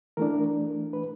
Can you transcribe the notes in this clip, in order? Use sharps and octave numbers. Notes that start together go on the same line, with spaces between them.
E3 A3 D4 A#4
B4